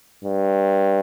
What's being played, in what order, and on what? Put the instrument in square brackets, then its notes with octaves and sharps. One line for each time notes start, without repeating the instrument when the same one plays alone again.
[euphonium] G2